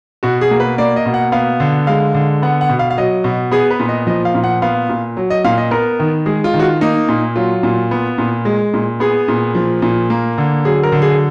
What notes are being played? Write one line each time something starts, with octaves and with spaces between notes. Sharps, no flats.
B2 F#4
G#4
A#3
B4
A#3 D5
D#5
B2
F#5
B3 F5
D3
G#3 F5
D3
B3 F#5
F#5
B2
F5
F5
F#3 D#5
B2
B3 G#4
B4
A#2
D#5
F3 D#5
F5
A#2
F#5
B3 F5
A#2
F#3
D#5
A#2 F5
D#5
B3 A#4
D#3
G#3 G#4
F4
D#3
F#4
F4
A#3 D#4
A#2
F#3 F4
A#2
B3
A#2
G#3
A#2
B3 G#4
A#2
F3
A#2
A#3
D3
F#3 G#4
A#4
D3
G#4